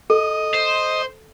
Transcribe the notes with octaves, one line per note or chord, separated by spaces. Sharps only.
A4 D#5
C5